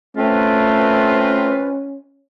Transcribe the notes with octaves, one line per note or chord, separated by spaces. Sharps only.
A3 C4 C#4 F4 B4